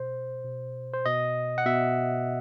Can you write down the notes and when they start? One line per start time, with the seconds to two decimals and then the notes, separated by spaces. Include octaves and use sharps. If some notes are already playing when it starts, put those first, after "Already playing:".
Already playing: B2 C5
0.44 B2
0.93 C5
1.06 B2 D#5
1.58 F#5
1.65 B2 E5